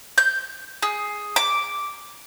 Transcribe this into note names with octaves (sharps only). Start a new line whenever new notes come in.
G6
G#4
D6